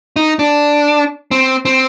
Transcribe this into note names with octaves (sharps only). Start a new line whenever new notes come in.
D#4
D4
C4
C4